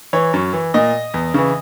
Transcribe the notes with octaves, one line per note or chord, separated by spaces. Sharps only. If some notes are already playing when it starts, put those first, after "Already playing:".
E3 C#5
F#2
E3
A#2 D#5
E2
C#3 E3